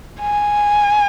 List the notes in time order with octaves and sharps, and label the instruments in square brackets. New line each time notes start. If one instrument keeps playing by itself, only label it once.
[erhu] G#5